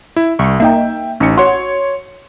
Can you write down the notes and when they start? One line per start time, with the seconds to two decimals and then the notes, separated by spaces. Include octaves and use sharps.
0.16 E4
0.39 C2 C#6
0.60 A#3 D#4 E5 G5
1.20 A1 C#4 D#4 C#7
1.37 F#4 C#5 C6